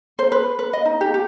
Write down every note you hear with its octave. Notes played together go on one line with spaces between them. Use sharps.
C5
B4
B4
D#5
D#4
G4
G4